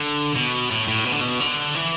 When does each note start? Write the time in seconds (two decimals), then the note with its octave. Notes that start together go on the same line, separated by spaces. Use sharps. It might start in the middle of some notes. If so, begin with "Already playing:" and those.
Already playing: D3
0.35 B2
0.71 A2
0.88 A2
1.05 B2
1.13 D3
1.21 B2
1.40 D3
1.75 E3